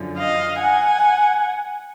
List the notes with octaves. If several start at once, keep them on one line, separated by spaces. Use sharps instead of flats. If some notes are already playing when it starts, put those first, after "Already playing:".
Already playing: F#2 D3 F3
D#5 F5
F#5 G#5